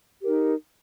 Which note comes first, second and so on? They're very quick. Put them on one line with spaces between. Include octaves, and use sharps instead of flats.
G4 A#4 D#4